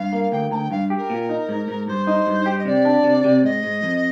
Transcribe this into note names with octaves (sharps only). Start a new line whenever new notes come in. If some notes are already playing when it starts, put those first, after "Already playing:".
Already playing: G2 F5
A#3
D2 G5
D2 G5 A#5
G2 F5
G4
A#4
A#2
D#4
G#2
G#2
G2 C5
D#4
G2
G4
D#5
C3 D5
D4
C3
C3
G#2 D#5
G#2
F2